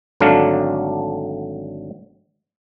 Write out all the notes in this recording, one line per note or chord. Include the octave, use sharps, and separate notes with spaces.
G#1 D3 F#3 A3 D4 F5